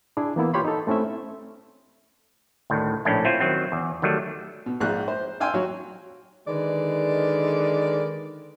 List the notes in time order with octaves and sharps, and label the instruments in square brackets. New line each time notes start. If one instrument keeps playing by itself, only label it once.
[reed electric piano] D4 E4 G#4
E3 A#3 B3 E4
F4 G4 C#5 B5 C6
D#4 A4
A3 C4 C#4 E4 E5
[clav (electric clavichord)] D2 A2 D#3
A#1 A2 C#4 D4 E4
C4 E4 F4 C5 C#5
D#3 F#3 C4
E2
D#3 F#3 G3 A3
[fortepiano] B2
A#1 G#2 F4 F#6
C5
F5 G5 G#5 C6 E6
F#3 F#4 C#5
[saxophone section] D3 D#3 G#3 B4 D5